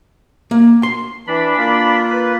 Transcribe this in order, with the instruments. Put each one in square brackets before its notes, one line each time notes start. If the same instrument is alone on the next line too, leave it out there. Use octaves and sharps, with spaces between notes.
[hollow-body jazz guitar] A#3
C6
[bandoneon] E3 [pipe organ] D4 B5
[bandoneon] A#3 F4
[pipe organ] B4